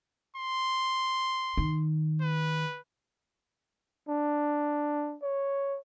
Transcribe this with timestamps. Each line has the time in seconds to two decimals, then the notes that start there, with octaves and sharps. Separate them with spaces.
0.36 C6
1.57 D#3
2.21 B4
4.09 D4
5.23 C#5